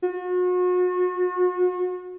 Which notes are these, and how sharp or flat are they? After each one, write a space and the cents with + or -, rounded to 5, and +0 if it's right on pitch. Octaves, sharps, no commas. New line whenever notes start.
F#4 -40